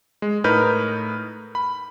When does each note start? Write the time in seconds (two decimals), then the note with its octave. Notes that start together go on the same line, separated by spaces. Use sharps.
0.22 G#3
0.44 A2 D#4 A#4 B4 F6 G6
1.55 B5